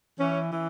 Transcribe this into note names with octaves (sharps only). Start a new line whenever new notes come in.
E3 C#4
E3